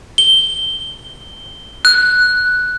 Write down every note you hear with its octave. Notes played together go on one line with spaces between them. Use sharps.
G7
F#6